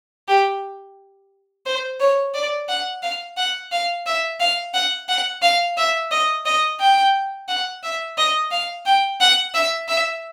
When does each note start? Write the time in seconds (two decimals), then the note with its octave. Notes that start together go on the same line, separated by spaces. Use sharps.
0.28 G4
1.66 C5
2.00 C#5
2.34 D5
2.68 F#5
3.03 F5
3.37 F#5
3.72 F5
4.06 E5
4.40 F5
4.74 F#5
5.09 F#5
5.42 F5
5.77 E5
6.11 D#5
6.45 D#5
6.80 G5
7.48 F#5
7.83 E5
8.18 D#5
8.51 F5
8.86 G5
9.21 F#5
9.54 E5
9.88 E5